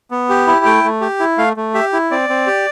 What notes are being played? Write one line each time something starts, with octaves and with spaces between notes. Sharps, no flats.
B3
G4
E4
A3 G5
A3
G4
E4
A3 F5
A3
G4 E5
E4
C4 D5
C4
G4